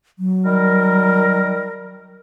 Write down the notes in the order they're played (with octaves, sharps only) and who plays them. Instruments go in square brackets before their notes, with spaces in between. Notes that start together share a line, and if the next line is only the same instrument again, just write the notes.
[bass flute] F#3
[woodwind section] D#3 G3 A#4